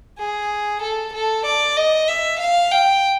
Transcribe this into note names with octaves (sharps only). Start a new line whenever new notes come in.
G#4
A4
A4
D5
D#5
E5
F5
G5